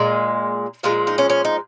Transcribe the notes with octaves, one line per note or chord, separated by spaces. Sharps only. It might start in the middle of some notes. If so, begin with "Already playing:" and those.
Already playing: A#2 G#3
A#2 F3 G#3 F4
D#4
C#4
C#4
D#4